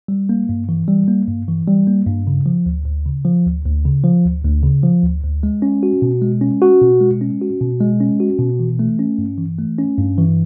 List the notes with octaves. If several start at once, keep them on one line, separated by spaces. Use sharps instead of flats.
G3
A#3
G2
E3
G3
A#3
G2
E3
G3
A#3
G2
C#3
F3
D2
D2
C#3
F3
D2
D2
C#3
F3
D2
D2
C#3
F3
D2
D2
G#3
C#4
F#4
B2
G#3
C#4
F#4
B2
G#3
C#4
F#4
B2
G#3
C#4
F#4
B2
E3
A3
C#4
G2
E3
A3
C#4
G2
E3